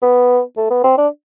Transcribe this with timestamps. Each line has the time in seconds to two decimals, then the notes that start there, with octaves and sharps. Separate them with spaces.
0.02 B3
0.57 A3
0.70 B3
0.84 C4
0.98 D4